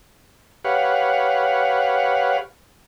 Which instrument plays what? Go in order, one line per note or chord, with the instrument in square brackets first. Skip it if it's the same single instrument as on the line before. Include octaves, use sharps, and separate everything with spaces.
[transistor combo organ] G4 B4 C#5 F5 F#5